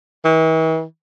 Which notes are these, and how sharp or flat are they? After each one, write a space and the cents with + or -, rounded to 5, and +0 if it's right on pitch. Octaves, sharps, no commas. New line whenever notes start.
E3 -45